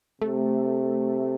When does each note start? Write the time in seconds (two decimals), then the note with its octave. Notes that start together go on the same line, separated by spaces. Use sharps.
0.21 C3 A3